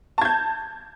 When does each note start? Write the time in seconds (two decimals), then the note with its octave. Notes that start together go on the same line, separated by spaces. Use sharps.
0.18 A5
0.21 G#6
0.25 G6